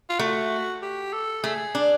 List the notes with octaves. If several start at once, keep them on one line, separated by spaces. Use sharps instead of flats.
F4
A3 F#4
G4
A4
A3 G#4
D4